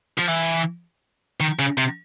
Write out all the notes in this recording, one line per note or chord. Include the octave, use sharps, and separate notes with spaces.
F3
E3
D#3
C#3
C3